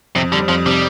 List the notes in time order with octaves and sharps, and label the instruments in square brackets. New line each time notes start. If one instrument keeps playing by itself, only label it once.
[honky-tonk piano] F2 [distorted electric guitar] C3
[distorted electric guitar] D3 [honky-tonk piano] G3
[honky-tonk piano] F2 [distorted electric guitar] F3
[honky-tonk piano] C3 [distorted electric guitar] G3